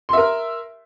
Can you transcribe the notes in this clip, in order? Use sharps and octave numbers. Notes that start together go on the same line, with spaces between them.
A#4 E5 C6